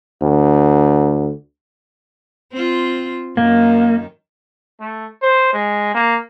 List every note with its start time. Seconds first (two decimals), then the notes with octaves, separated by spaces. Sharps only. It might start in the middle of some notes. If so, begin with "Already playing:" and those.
0.22 D2
2.52 C4 F4
3.37 F#2 D#3 A#3
4.80 A3
5.22 C5
5.53 G#3
5.95 A#3